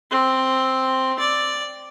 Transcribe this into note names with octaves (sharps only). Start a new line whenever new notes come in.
C4
D5